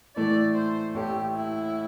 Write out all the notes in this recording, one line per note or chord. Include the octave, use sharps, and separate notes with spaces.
A2 E3 A3 E4 D5
C5
A1 A2 A3 E4 G4
E4